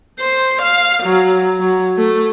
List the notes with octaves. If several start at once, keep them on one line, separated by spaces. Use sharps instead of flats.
C5
F5
F#3
F#3
A3